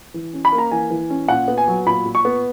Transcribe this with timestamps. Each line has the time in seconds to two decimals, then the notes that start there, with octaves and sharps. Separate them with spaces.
0.14 E3
0.34 C#4
0.45 B5
0.52 A#3
0.58 A#5
0.71 E3 G#5
0.90 E3
1.10 C#4
1.28 A#2 F#5
1.48 B3
1.58 G#5
1.68 F#3
1.86 A#2 B5
2.06 A#2
2.15 C#6
2.25 B3